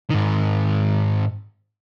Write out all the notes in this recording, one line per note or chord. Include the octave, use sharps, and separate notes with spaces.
G#2 D#3